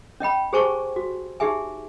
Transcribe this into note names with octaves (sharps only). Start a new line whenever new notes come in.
C#4 D#5 G5 B5
G4 G#4 C5 G#5 A5 C#6
F#4
D#4 G4 G#4 E5 G#5